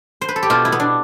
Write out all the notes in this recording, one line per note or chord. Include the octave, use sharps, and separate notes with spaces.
C5
B4
A4
G4
B2 F4
E4
B3
D4